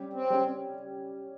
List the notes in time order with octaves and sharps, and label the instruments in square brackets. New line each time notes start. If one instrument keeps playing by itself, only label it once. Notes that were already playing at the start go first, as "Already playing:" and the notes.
Already playing: [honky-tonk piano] G3 C#4 G4
[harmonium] C4
[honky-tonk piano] G3 C#4 G4